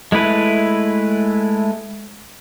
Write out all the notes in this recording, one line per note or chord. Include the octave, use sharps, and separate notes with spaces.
G#3 A3 E4 B4